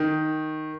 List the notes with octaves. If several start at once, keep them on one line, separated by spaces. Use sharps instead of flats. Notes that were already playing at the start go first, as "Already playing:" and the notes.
Already playing: D#3